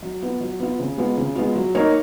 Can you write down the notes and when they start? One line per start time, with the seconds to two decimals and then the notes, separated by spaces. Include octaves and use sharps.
0.02 F#3
0.22 B3 F4
0.41 F#3
0.60 B3 F4
0.80 C#3
0.98 G#3 B3 F4
1.17 C#3
1.36 G#3 B3 F4
1.56 F#3
1.75 A#3 D#4 A#4 C#5